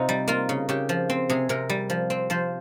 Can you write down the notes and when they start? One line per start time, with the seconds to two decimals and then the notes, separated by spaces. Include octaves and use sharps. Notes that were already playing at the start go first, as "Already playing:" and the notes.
Already playing: C3 D#4 F4
0.09 G3
0.28 A#3 F4
0.49 C#3
0.69 C#3 G4
0.89 F3
1.10 C4
1.30 C3 G#4
1.49 C3 A#4
1.69 G3
1.90 F3
2.10 C4
2.30 F3 C5